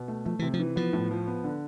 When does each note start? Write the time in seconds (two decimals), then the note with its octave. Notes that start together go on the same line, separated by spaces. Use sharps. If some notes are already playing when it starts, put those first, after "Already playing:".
Already playing: B2
0.08 A3
0.25 F3 A3
0.39 C3 E3
0.54 F3
0.60 E3
0.76 F3 B3
0.93 A2
1.11 F3
1.27 B3
1.44 D3